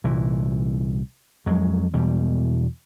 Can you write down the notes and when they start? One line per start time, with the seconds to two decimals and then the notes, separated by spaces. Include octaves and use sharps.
0.04 C2 A#2 E3
1.46 F2 F#3 G#3
1.94 E2 B2 G3